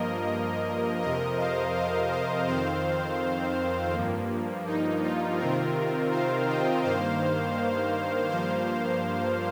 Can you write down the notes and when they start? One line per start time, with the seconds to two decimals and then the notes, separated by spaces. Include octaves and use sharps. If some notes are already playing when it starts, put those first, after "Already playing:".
Already playing: G2 F3 A#3 A#4 D#5
1.02 F2 C3 F3 A#4 D#5
1.39 C5 F5
1.75 C5 F5
2.11 C5 F5
2.48 F2 D#3 C4 C5 F5
3.93 G2 F3 A#3
4.66 D#4
5.03 F4
5.38 C3 D#3 C4 F4 A#4
6.11 C5 F5
6.47 D#5 G5
6.84 G2 D#3 A#3 C5 F5
8.29 G2 F3 A#3 C5 F5